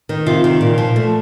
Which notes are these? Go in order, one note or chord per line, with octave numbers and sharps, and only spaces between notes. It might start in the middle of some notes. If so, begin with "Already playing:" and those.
D#3
C3 F4
D#3
A#2
F3
A3